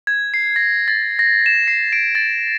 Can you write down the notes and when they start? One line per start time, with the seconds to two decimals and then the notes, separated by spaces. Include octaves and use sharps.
0.07 G#6
0.34 C7
0.56 A#6
0.88 A6
1.19 A#6
1.46 E7
1.68 C7
1.93 D7
2.15 A6